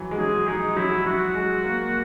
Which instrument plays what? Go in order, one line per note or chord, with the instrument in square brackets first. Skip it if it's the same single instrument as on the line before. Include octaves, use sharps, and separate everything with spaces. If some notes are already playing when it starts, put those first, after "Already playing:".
Already playing: [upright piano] E3 F#3
G#3
[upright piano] F#3 [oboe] G#4
[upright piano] G#3 [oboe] D#4
[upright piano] F#3 [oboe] E4
[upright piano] F#3 [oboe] F#4
[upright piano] G#3
A#3